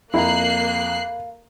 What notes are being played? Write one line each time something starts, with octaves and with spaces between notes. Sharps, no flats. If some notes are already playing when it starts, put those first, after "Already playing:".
F2 A#3 E4 F5 A#5 F#6 C7